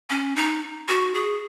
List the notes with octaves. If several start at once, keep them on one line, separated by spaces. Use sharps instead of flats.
C#4
D#4
F#4
G#4